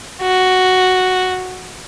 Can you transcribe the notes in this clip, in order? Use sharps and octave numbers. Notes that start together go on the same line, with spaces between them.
F#4